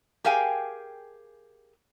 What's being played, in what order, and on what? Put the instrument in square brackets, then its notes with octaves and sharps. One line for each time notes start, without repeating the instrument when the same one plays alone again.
[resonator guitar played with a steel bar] G4 G#4 A#4 F5 G5 G#5